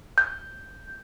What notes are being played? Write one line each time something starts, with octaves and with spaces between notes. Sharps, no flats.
G6